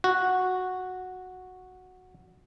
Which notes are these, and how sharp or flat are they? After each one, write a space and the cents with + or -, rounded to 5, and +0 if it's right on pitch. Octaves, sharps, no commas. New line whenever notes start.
F#4 -5